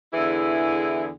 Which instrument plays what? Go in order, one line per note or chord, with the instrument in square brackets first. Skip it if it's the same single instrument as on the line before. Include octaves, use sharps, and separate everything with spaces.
[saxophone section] E2 D3 E3 E4 G#4